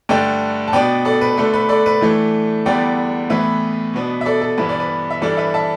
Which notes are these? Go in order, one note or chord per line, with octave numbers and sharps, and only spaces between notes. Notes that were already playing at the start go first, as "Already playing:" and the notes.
G2 D3 A3 D4 D5 G5
A5
B2 B3 D4 D5 G5
A4 D5
B4
D3 A3 D4 A4
B4
A4 D5
B4
A2 E3 A3 D4
E2 D3 G3 B3 D5 G5
A2 E3 B3 B4 E5
B2 B3 D4
E5
A4 D5
A4
G2 E3 B3 B4
D5
B4
E5
G2 E3 G3 D4 A4 D5
B4 E5
E5 A5